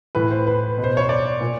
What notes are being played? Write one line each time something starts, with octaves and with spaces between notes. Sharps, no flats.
A2 E3 B4
C5
B4
B2
C5
C#5
D5
A#2